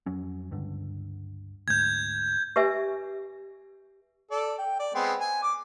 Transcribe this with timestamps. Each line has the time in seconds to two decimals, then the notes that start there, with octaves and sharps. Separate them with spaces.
0.06 F2 F#3 C#4
0.51 C#2 G2 D3
1.68 D2 G#2 G6 G#6
2.56 G4 B4 E5 G#5
4.31 A4 D5
4.58 G5
4.79 D5
4.95 G#3 B3 C4
5.20 G#5
5.43 D6